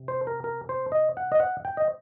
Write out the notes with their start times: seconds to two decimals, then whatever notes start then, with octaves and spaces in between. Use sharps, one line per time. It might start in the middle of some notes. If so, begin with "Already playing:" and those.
Already playing: C3
0.08 C5
0.27 A#4
0.44 A#4
0.69 C5
0.92 D#5
1.17 F#5
1.32 D#5
1.40 F#5
1.65 G5
1.77 D#5